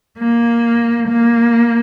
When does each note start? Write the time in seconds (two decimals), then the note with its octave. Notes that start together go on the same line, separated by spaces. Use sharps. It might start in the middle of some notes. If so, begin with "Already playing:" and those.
0.18 A#3
1.08 A#3